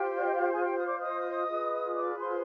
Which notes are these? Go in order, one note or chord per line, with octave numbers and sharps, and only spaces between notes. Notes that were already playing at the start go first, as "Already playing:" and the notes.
Already playing: F4 G4 C5 G5
D5
D#5
F5
G5
G#4 G#5
F5
G4 G5
D#6
D5 D6
D#5 D#6
F4 G#4 B4
D5 D6
C5 C6